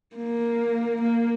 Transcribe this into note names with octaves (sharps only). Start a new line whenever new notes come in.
A#3
A#3